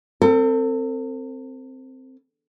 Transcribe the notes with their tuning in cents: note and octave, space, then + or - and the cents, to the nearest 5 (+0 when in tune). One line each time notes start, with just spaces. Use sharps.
C4 +0 A4 +45